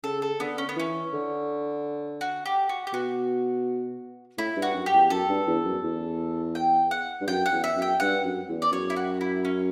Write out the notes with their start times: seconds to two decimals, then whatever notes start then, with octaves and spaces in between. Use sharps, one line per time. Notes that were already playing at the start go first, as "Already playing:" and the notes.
0.03 C#3 A4
0.22 A4
0.40 D3 B3
0.58 C#4
0.69 B3
0.76 E3 C#4
1.13 D3
2.21 F#4
2.46 G4
2.69 F#4
2.87 G4
2.93 B2 F#4
4.38 A2 E4
4.57 G2
4.62 F#4
4.74 F#2
4.86 G4
4.93 E2
5.10 F#2 A4
5.29 G2
5.47 E2
5.64 F#2
5.83 E2
6.55 G5
6.91 F#5
7.21 G2
7.27 F#2 G5
7.46 F#5
7.52 E2
7.64 E5
7.76 F#2
7.82 G5
8.00 G2 F#5
8.24 F#2
8.48 E2
8.62 D5
8.72 F#2 C#5
8.90 E4
8.96 F#4
9.21 E4
9.45 C#4